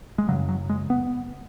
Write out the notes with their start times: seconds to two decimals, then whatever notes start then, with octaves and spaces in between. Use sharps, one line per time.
0.18 G#3
0.28 C#3 F#3
0.32 F#2
0.49 F#3
0.69 G#3
0.90 B3